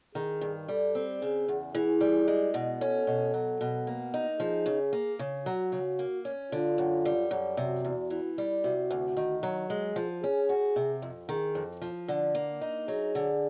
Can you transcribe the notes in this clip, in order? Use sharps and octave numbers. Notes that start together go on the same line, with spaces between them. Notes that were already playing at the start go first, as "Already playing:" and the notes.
D#3 G#4
G2
G3 A4
C4
C#3 G#4
E2
E3 G#4
G3
G#3
B2
C#4 A4
B2
F#3
B2
A#3
D#4
F3 G#4
C#3
A#3
C#3
F#3 F#4
C#3
A#3
C#4
D3 F4
F#2
G3
F#2
C3 F#4
E2
E3
G3
C3 F#4
D2
D#3
F#3
G#3 G#4
F3
C#4 G#4
F#4
C3
F2
D#3 G#4
F2
F3
D3
A#3
D#4
F#3 G#4
D3